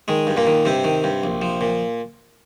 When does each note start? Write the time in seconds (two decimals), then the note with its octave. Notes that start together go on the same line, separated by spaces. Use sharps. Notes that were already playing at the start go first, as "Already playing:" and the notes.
0.08 D#3 G#3
0.27 G2
0.37 A#2 A#3
0.47 D#3
0.65 G2 C3 C4
0.84 D#3
1.04 G2
1.23 A#1
1.42 F3
1.61 A#2